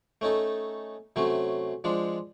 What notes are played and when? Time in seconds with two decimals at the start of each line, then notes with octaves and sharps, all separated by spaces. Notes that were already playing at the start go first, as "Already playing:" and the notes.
0.21 A3 C#4 D#4 A4
1.16 C3 F#3 A3 C#4
1.84 F3 G#3 D4